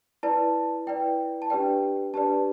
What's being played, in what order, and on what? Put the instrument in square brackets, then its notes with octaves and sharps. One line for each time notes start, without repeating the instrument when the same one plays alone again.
[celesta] E4 B4 D5 A5
E4 B4 D5 G5
A5
D4 G4 B4 D5 G5
D4 G4 B4 D5 A5